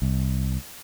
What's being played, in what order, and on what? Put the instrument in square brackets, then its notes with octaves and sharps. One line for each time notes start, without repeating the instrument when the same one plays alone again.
[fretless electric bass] C2